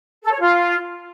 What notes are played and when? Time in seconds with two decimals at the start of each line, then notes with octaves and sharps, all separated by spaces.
0.23 A4
0.32 C#5
0.40 F4